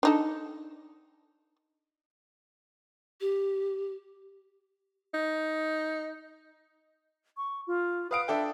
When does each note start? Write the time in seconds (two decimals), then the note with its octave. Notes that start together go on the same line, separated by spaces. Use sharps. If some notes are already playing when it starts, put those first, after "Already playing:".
0.03 D4 D#4 A4
3.21 G4
5.14 D#4
7.37 C#6
7.67 F4
8.11 B4 F5 D#6 D7
8.28 D4 A4 E5 G5